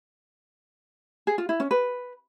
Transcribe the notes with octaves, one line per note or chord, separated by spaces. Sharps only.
G#4
F4
E4
C#4
B4